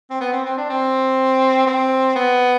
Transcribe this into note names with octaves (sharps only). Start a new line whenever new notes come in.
C4
B3
C4
C4
D4
C4
C4
B3